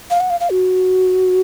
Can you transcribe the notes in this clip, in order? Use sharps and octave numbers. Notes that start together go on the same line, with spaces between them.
F5
F#5
F5
F5
F#4